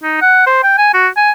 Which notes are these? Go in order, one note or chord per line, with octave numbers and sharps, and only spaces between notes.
D#4
F#5
C5
G5
G#5
F#4
G#5